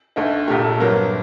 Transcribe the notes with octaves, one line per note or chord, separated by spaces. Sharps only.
D2 D3 A3 D#4
A#1 A#2 A3 G4
A4
G1 G2 F#3 A#3 A#4